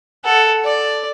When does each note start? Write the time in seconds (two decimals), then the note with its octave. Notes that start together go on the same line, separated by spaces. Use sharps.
0.24 A4 F#5
0.64 D5